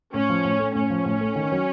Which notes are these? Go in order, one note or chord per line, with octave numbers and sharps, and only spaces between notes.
A2 C#4
F3
A2
A3
A2 C#4
F3
A2
A3
D#3
F#3